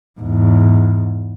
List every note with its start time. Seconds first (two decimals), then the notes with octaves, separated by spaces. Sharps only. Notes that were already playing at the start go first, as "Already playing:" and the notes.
0.21 E2 G#2